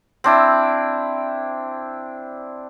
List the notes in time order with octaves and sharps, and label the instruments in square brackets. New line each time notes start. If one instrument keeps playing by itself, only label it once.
[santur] C4 D4 E4